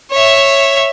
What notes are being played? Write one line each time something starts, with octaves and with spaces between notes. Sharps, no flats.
C#5 E5